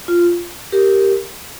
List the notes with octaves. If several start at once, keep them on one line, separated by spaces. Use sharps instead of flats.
F4
G4 A#4